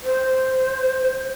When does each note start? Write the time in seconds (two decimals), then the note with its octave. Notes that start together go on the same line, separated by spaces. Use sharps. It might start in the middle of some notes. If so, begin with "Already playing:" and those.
0.04 C5